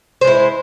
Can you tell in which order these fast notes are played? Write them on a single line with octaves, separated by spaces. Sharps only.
C5 G#3 E4